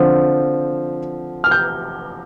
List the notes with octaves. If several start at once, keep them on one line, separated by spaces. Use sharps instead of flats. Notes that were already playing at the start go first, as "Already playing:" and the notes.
Already playing: D3 F3 C4
F6
G6